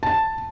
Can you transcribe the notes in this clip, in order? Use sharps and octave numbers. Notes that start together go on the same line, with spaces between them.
A5